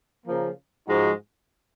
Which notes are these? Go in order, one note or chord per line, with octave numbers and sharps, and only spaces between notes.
C#3 F3 A#3
G#2 F3 G#3 D#4 F#4